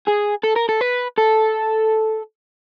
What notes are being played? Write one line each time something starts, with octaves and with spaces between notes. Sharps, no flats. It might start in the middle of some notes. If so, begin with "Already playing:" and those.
G#4
A4
A#4
A4
B4
A4